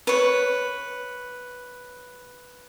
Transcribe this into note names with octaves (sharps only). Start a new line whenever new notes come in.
B4 C#5